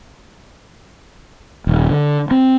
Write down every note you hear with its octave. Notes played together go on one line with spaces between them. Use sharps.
D#1
D3
C4